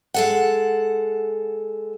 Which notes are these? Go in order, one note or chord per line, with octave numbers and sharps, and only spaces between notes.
G#3 A4 F#5